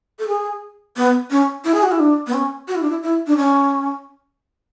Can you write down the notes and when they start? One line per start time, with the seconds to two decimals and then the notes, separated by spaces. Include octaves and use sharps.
0.19 A4
0.27 G#4
0.97 B3
1.31 C#4
1.65 E4
1.74 G#4
1.83 F#4
1.91 E4
1.99 D4
2.27 B3
2.33 C#4
2.68 F#4
2.75 E4
2.82 D4
2.90 E4
3.03 E4
3.27 D4
3.37 C#4